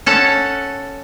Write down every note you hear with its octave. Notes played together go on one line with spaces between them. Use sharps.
C#4 A4 F#5